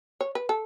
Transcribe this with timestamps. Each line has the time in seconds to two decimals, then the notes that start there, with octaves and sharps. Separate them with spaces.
0.21 C#5
0.35 B4
0.49 A4